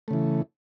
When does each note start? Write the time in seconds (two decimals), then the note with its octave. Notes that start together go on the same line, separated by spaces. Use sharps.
0.08 A3
0.11 C#3
0.13 E3